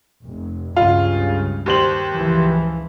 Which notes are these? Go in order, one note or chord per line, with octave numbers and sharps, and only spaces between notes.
F1
C#2 G2 C#3 F4
D#2 C5 F#7
C#2 E3 F3